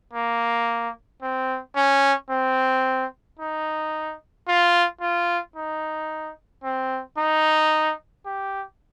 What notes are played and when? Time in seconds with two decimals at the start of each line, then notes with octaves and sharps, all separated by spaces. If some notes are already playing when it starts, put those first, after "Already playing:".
0.13 A#3
1.22 C4
1.76 C#4
2.30 C4
3.39 D#4
4.48 F4
5.01 F4
5.56 D#4
6.63 C4
7.17 D#4
8.26 G4